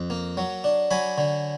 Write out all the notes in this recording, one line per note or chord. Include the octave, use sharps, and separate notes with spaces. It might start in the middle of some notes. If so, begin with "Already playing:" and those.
Already playing: F2
A#3
F#3
D4
F#3 G#5 B5
D3